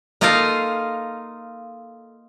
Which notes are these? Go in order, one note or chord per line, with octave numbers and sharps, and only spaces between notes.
A#3 D#4 F4 A4 D#5 F5